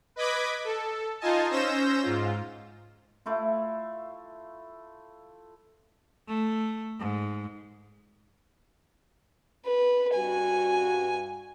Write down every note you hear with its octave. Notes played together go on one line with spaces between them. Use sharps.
B4 D#5 B5 D6 G#6 B6
A4
D#4 F4 D#5 G#5 A5
C#4 C5 E6 G6 A#6 E7
G#2 F4
A3 E4 F4
A3
G#2
B4
G2 F#4 G#5